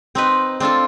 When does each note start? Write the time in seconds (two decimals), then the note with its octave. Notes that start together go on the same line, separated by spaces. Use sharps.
0.15 C4 D#4 B4
0.60 C4 D4 F4 A4